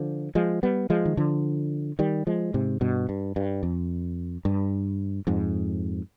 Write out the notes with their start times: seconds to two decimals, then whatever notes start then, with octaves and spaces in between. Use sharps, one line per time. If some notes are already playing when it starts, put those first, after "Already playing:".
Already playing: D3 F3
0.35 F3 G#3
0.63 G3 B3
0.90 F3 G#3
1.05 D#3
1.17 D3 F3
1.99 D#3 G3
2.27 F3 G#3
2.54 G#2 C3
2.81 G2 B2
3.09 G2
3.36 G2
3.63 F2
4.45 G2
5.27 F2 G#2